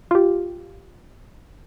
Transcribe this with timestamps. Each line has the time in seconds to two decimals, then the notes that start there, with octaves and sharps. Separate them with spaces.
0.11 F4 G4